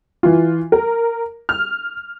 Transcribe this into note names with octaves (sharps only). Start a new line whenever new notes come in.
E3 F4
A#4
F6